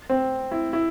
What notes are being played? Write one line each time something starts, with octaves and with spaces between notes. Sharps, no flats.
C4
E4
E4